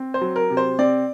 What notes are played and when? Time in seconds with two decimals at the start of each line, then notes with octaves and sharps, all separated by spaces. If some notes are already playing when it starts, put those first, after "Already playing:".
Already playing: C4
0.14 C5
0.21 F#3
0.36 A#4
0.50 C3
0.57 C5
0.79 C4 D5